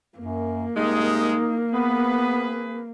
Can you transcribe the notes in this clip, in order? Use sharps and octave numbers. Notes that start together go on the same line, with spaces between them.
F#2 A#3
C3 G3 G#3 D#4
B3 C4 G#4 B4